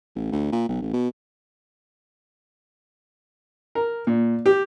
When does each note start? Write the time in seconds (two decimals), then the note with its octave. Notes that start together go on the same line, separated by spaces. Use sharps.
0.15 A1
0.32 D2
0.52 A#2
0.69 B1
0.82 A1
0.94 B2
3.75 A#4
4.07 A#2
4.46 G4